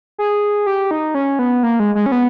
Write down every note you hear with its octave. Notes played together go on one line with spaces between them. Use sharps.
G#4
G4
D#4
C#4
B3
A#3
G#3
G#3
C#4
B3